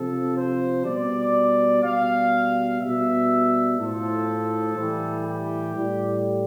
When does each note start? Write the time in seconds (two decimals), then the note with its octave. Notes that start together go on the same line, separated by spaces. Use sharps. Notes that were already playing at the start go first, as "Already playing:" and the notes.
Already playing: C3 F3 A4
0.36 C5
0.85 B2 G3 D5
1.83 B2 G3 F5
2.80 B2 G3 E5
3.78 A2 F3 A4
4.76 A2 E3 G3
5.25 G4
5.74 A2 G3